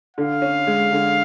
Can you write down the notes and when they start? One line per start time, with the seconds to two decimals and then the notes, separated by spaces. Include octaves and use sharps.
0.17 D3 F5
0.42 C#4
0.67 G#3
0.92 D3